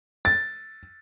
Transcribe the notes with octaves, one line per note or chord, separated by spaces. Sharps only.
A6